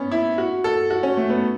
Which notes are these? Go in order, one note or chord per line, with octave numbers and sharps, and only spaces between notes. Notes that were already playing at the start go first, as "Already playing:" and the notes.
Already playing: B3 C#4
E4
F#4
A4
F#4
C#4
A3
B3